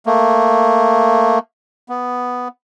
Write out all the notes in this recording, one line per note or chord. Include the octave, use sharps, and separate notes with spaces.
A3 A#3
B3